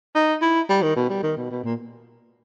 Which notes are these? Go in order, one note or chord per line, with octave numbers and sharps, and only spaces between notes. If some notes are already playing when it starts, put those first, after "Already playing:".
D#4
E4
G3
D#3
B2
G3
D#3
B2
B2
A#2